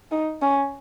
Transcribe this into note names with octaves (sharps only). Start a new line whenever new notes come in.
D#4
C#4